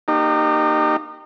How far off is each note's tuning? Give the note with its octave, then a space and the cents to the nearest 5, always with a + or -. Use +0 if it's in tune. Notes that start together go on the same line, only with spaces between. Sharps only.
A#3 -5 D#4 -30 G4 +0